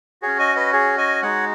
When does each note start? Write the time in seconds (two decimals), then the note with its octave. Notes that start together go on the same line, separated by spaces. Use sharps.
0.22 C#4 F#4 G#4 C#5
0.39 D#5 G#5
0.55 B4 D#5
0.73 G#4 C#5
0.98 D#5 G#5
1.22 G#3 D#4 F#4 C#5 F#5